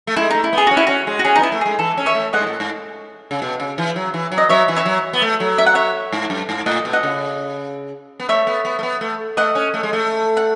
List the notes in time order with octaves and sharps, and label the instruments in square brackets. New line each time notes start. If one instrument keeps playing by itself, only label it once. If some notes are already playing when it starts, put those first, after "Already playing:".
[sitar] A3
[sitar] G#3 [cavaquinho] E4
[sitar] A3 [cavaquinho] D#4
[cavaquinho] E4
[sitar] B3 [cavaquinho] G#4
[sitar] C#4 [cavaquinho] F#4
[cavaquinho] E4
[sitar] C#4 [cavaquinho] F#4
[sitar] G#3
[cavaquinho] F#4
[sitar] C#4 [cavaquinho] G#4
[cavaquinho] D#4
[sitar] B3
[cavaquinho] E4
[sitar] A3
[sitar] G#3 [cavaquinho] G#4
[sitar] E3 [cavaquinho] A4
[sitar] C#4
[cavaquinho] C#5 E5
[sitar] A3
[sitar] G#3 [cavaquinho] D#5 F#5
[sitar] G#2
A2
G#2
C#3
B2
C#3
E3
F#3
E3
F#3
[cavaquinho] D#5
[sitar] F#3 [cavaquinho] C#5 E5
[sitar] E3
[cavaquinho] C#5 E5
[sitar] F#3
B3
A3
F#3
[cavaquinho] E5
F#5
C#5 E5
[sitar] G#2
F#2
G#2
[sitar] A2 [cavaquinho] D#5 F#5
[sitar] B2
[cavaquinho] D#5 F#5
[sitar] C#3
B3
[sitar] A3 [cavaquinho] C#5 E5
[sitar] B3
B3
A3
B3
A3
[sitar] A3 [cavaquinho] D#5 F#5
[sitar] C#4
A3
G#3
A3
[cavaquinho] F#5